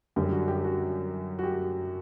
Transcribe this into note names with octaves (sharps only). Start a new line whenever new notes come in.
F#2 D3 G3 G4
F#4
G4
F#4
F#4
G4